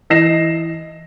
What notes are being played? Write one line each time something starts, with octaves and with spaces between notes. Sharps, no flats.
E3 D#5 A#6 C7 E7